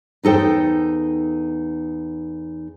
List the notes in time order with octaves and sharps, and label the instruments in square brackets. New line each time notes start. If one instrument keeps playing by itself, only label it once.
[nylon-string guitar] E2 D#4 A4 C5 G5